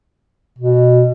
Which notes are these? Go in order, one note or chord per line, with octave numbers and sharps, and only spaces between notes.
B2